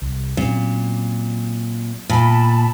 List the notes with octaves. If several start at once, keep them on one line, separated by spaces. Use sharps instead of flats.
C2
A#2 F#3 C4 C#4
A#2 A5 B5